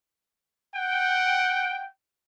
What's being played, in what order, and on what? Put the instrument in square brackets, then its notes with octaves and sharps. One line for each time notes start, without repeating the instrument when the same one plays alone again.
[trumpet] F#5 [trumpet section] G5